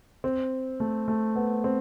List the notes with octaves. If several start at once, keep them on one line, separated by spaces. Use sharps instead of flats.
C4
A3
A3
B3
C4